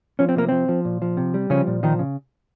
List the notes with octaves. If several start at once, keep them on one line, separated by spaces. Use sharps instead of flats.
F3 C#4
C4
C3 A#3
F3 C4
F3
A#2
F3
C3
G3
C#3 F3 C#4
A#2
D#3 F3 D#4
C#3